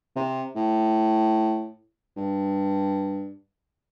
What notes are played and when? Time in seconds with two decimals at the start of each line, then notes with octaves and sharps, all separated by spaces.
0.16 C3
0.56 A2
2.17 G2